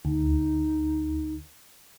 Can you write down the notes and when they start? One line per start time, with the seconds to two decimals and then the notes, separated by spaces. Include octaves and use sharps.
0.05 D2 D#4